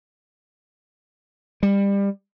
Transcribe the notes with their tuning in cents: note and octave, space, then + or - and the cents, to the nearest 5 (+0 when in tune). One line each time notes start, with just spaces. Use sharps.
G3 +25